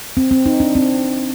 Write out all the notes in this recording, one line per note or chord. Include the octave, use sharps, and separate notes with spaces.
C4
C4
D#4
D4
C4